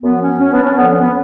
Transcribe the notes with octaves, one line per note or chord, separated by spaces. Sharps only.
F#2 F3 B3
C#4
C#4
B3 D4
C#4
D2 D3 F3 B3
C#4
B3